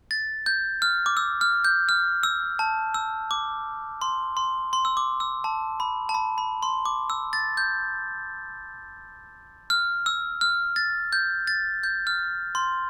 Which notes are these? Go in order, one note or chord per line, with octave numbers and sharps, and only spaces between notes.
A6
G6
F6
D6
E6
F6
G6
F6
E6
A5
E6
D6
C6
C6
C6
E6
D6
E6
A5
B5
A5
B5
B5
C6
D6
E6
A6
G6
F6
E6
F6
A6
G6
A6
G6
F6
C6